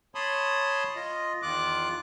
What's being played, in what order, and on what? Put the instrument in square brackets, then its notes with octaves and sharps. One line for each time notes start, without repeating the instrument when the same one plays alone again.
[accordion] C#5 A5 B5 C6 D#6
F4 D#5
E2 D#3 F4 D6 F#6